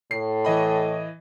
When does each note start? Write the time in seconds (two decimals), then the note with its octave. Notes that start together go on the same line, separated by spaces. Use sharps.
0.11 A2 C7
0.45 E3 D#5 B5